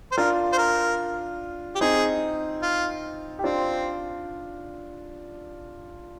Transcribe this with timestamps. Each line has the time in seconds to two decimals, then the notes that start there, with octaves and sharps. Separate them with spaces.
0.12 C5
0.17 D4 F4 A#4
0.52 C5
0.58 A#4
1.75 G4
1.81 C4 D#4 G#4
2.62 F4
3.39 G4
3.44 C4 D4 F4